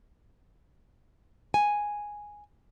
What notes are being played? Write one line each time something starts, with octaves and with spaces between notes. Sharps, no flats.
G#5